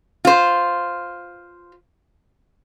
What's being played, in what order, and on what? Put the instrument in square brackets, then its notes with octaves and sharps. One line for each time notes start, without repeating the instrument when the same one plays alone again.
[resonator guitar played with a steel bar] F4 C5